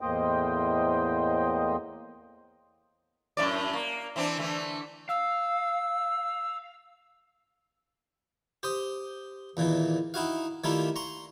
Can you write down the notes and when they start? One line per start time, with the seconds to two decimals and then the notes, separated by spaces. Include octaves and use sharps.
0.01 E2 A2 A#3 C5 D#5 G5
3.37 F#2 A2 D5
3.73 A#3
4.16 E3 C4 D4
4.37 D3 E3 A3
5.09 F5 E6
8.63 G4 C5 D#6
9.57 E2 A#2 D#3 E3
10.14 D#4 E4 F#4 F5
10.64 D#3 G3 A3 A#3 E4 F4
10.96 A#5 C6 C#6